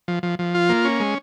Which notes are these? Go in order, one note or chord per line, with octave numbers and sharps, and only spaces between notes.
F3
F3
F3
F4
A#3
C#4
G#3